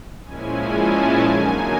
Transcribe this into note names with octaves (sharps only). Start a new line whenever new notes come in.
A#2 F3 G#3 C#4 E4 G#5
A5
D3 F#3 A#3 D#4 G#5